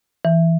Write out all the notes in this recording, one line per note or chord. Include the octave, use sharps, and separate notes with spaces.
E3